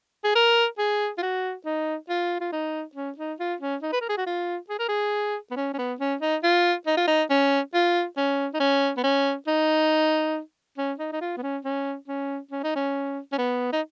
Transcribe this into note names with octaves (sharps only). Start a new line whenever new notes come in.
G#4
A#4
G#4
F4
F#4
D#4
F4
F4
D#4
C#4
D#4
F4
C#4
D#4
B4
A#4
G#4
F#4
F4
G#4
A#4
G#4
B3
C#4
C#4
B3
C#4
D#4
F4
D#4
F4
D#4
C#4
F4
C#4
D#4
C#4
B3
C#4
D#4
C#4
D#4
D#4
F4
B3
C#4
C#4
C#4
C#4
D#4
C#4
C#4
B3
D#4